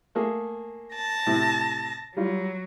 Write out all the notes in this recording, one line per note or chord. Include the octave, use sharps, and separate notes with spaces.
A3 A#3 G#4
A5 A#6
A2 C3
F#3 G3 F4